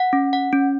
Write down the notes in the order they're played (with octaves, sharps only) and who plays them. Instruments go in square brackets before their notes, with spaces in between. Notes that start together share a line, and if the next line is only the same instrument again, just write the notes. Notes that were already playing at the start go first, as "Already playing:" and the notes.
Already playing: [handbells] F#5
C#4
F#5
C#4